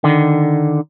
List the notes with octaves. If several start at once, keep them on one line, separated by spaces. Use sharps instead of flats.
D3 D#3